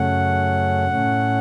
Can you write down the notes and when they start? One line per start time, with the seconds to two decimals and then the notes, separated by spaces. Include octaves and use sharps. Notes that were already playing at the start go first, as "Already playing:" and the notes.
Already playing: F#2 C#3 A3 C#4 F#5
0.87 A2 A3 C#4